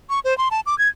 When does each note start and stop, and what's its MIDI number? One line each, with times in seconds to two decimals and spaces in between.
0.10 0.20 85
0.25 0.36 72
0.38 0.49 84
0.51 0.61 81
0.66 0.77 86
0.79 0.88 92